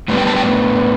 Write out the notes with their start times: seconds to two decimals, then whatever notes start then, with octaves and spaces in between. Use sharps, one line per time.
0.08 A2 G3 B3 D4
0.18 G5
0.27 A5
0.36 G5